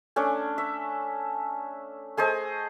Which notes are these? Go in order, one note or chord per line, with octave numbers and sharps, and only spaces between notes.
A3 C#4 D4
E5
A3 G#4 C5 D#5